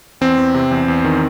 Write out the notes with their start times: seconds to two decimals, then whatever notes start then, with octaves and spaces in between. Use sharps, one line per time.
0.21 E2 C4
0.37 E2
0.54 C3
0.71 E2
0.88 E2
1.04 D#3